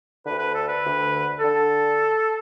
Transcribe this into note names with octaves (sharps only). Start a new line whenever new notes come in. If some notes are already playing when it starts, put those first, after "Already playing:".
D2 D3 B4
B4
A4
B4
D2 D3
D3 A4